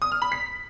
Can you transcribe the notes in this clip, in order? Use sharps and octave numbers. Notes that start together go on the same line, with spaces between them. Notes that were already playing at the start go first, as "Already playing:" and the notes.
D#6
F6
B5
B6